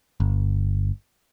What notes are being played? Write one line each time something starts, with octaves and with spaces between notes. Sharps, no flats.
G1